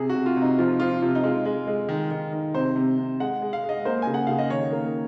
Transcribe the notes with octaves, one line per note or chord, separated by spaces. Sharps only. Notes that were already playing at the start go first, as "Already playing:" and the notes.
Already playing: C3 G#4
F#4
C3
F4
C3
D#4
F3 F4
F3 F4
C3 F4
D#4
G#3 F4
G#3
G#3
D#3
D#3
D#3
C3 C5
C3
C3
G#3 F#5
G#3
F5
G#3
D#5
A#3 C5
C#3 G#5
F#5
C#3 F5
D#5
D#3 C#5
A#3